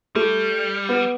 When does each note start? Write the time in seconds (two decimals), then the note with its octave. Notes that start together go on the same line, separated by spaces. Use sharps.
0.15 G3 A3
0.89 B3